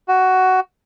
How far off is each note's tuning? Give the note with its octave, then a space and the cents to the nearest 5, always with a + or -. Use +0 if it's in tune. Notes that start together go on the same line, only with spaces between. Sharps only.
F#4 +10